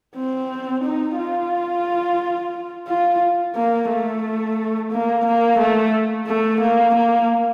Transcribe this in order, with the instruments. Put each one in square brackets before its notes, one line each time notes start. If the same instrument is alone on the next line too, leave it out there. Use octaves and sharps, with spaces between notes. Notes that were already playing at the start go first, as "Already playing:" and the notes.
[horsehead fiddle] C4
D#4
F4
F4
A#3
A3
A#3
A#3
A3
A3
A#3
A#3